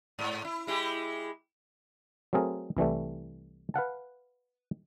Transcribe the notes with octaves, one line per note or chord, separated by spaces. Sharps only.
G#2
E4
G#3 E4 G4
F#3 A3 C4 G#4 A#4
C2 E3 G3 A3
B4 F5 F#5 A5